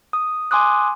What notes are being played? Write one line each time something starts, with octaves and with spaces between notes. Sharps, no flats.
D#6
G#5 C6 D6 D#6 F#6